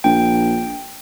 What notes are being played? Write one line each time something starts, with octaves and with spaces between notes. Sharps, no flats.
A#1 G5